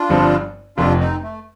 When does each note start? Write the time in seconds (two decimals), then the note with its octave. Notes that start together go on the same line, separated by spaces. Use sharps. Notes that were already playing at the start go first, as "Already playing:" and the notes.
Already playing: D4 F4
0.09 G1 G2 F3 C4
0.77 F1 F2 C3 D4 F4
1.00 C4 D#4
1.23 A3